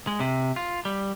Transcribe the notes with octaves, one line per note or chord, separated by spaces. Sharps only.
G#3
C3
F4
G3